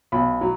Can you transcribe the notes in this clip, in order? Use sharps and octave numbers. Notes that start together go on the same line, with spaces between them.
B1 B5
F#3